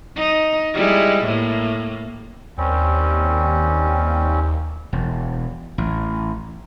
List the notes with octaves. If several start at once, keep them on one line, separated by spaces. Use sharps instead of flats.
D#4
G3 G#3 E4
A2 A#3
D#2 G3 C4 C#4
E1
A1